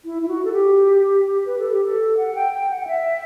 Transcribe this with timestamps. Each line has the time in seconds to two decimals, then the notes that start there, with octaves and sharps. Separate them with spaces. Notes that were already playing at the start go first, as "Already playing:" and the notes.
0.05 E4
0.22 E4
0.28 F#4
0.45 A4
0.53 G4
1.46 B4
1.59 A4
1.72 G4
1.84 A4
2.17 F#5
2.35 G5
2.53 G5
2.70 F#5
2.81 F#5
2.87 E5